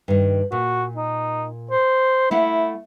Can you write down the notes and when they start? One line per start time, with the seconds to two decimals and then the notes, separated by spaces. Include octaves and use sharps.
0.08 G2 D#3
0.52 A#2 F#4
0.97 D#4
1.71 C5
2.31 A3 E4 F5 F#5